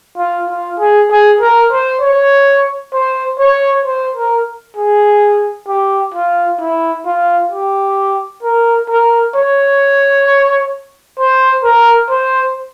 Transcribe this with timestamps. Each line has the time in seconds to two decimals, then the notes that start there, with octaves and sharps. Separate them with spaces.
0.18 F4
0.49 F4
0.79 G#4
1.10 G#4
1.41 A#4
1.71 C5
2.01 C#5
2.93 C5
3.39 C#5
3.85 C5
4.15 A#4
4.76 G#4
5.68 G4
6.14 F4
6.60 E4
7.06 F4
7.52 G4
8.43 A#4
8.88 A#4
9.35 C#5
11.19 C5
11.64 A#4
12.09 C5